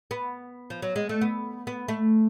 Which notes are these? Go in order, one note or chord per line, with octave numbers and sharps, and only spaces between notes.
B3
F3
F#3
G#3
A3
B3
B3
A3